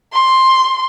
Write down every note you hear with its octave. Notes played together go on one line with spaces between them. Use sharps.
C6